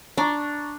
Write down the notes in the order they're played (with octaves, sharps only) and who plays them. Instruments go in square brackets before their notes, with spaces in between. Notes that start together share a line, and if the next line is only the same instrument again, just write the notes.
[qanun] D4 [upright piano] A#5 C#6